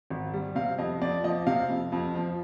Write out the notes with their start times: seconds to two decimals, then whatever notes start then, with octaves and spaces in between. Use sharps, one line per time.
0.10 G#1
0.33 G3
0.55 C3 F5
0.78 F2 D#5
1.01 F2 D5
1.24 F3 D#5
1.47 C3 F5
1.69 F2
1.92 F2
2.15 F3